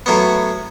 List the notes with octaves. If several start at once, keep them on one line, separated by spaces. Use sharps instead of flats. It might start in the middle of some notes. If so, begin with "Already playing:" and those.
A2 F#3 B3